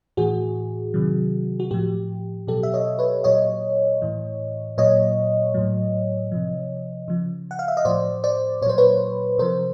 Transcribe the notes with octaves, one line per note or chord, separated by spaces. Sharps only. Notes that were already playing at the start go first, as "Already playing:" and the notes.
A2 E3 F#4 G#4
C3 D#3 F#3
F#4
A2 F3 G4
B2 F#3 G4 A4
E5
C#5 D#5
B4 C#5
A#2 F#3 C#5 D#5
A2 E3
A#2 F#3 C#5 D#5
A2 F#3
C3 F3
C#3 F3
F#5
F5
E5
D#5
A2 F3 C5 D5
C5 D5
A#2 F#3 C5 C#5
B4 C#5
C3 F3 A#4 C5